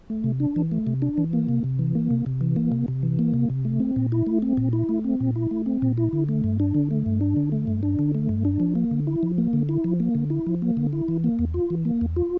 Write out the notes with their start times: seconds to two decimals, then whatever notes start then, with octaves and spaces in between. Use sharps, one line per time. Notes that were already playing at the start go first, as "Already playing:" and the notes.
0.10 A3
0.24 C3
0.40 D4
0.56 E3
0.71 A3
0.87 C3
1.02 D4
1.18 E3
1.33 A#3
1.49 C3
1.64 C3
1.79 E3
1.95 A#3
2.10 C3
2.26 C3
2.41 E3
2.56 A#3
2.72 C3
2.88 C3
3.03 E3
3.19 A#3
3.34 C3
3.50 C3
3.65 A3
3.80 C4
3.96 A#2
4.12 E4
4.27 A3
4.42 C4
4.57 A#2
4.73 E4
4.89 A3
5.04 C4
5.20 A#2
5.36 E4
5.51 A3
5.66 C4
5.82 A#2
5.98 E4
6.13 D3
6.29 A3
6.44 G2
6.60 D4
6.74 D3
6.91 A3
7.06 G2
7.21 D4
7.36 D3
7.52 A3
7.67 G2
7.83 D4
7.99 D3
8.15 A3
8.29 G2
8.45 D4
8.60 F3
8.75 A#3
8.91 D3
9.07 E4
9.23 F3
9.38 A#3
9.53 D3
9.69 E4
9.84 F3
10.00 A#3
10.15 D3
10.30 E4
10.47 F3
10.62 A#3
10.77 D3
10.93 E4
11.08 E3
11.24 A#3
11.39 E2
11.54 F4
11.70 E3
11.85 A#3
12.01 E2
12.16 F4